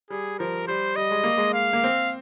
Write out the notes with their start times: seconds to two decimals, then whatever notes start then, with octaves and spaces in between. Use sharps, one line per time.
0.10 G3 G#4
0.39 F3 A#4
0.68 G3 C5
0.96 G3 D#5
1.11 G#3
1.24 A#3
1.38 G#3
1.54 F5
1.73 A#3
1.84 C4